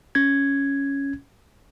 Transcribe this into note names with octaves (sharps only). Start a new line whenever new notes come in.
C#4 G#6